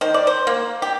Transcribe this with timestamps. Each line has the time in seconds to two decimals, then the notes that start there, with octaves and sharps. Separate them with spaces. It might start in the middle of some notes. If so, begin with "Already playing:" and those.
0.01 D#3 C5
0.14 D5
0.27 C5
0.47 A#3
0.82 G4